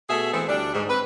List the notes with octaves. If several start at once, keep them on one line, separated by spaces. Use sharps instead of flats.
B2 A3 G#4 A4 E5
E3 G#3 A3 B3 C4
D2 G3 D4
G#2
C4 B4